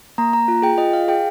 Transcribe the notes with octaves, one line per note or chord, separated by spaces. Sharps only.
A#3 A#5
A#3 A#5
F4
G#4 G5
F4 D#5
G#4 F5
G#4 G5